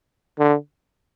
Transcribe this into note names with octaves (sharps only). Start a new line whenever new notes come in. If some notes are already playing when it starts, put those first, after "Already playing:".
D3